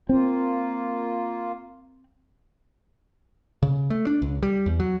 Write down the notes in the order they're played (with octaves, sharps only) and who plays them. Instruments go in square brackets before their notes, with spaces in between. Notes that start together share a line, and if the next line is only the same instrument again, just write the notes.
[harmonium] A#3 F4 [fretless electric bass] C4
[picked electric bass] C#3
A3
D4
C#2
G3
E2
F#3